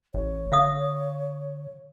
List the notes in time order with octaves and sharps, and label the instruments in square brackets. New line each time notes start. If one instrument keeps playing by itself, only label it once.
[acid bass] A1 [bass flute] C#5
[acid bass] D3 [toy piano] E5 F5 D#6